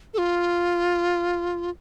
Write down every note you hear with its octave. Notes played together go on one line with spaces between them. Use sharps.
A4
F4